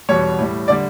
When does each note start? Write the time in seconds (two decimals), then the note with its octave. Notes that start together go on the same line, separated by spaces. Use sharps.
0.09 E2 B2 G3 C#5
0.39 A2 G3
0.68 D3 G3 D5